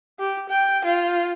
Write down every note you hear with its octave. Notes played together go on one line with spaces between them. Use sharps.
G4
G5
F4